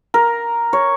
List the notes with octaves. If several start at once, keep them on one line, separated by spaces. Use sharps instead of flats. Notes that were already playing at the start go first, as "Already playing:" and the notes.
A#4
C#5